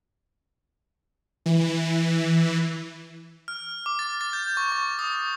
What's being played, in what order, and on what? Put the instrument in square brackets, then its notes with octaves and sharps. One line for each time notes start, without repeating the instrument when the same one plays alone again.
[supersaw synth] E3
[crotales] F6
D6
A6
A6
G6
C#6
C#6
D#6